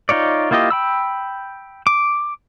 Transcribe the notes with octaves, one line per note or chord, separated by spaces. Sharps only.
D#4 F4 C#5 D5
A#3 E4 F4 G4 D#5
G5 B5 E6
D6